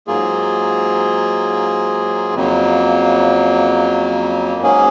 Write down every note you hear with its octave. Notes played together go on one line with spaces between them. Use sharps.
G#2 F#3 A#3 F4 G#4
F2 C#3 F#3 A#3
G#2 F#3 A#3 C#4 G#4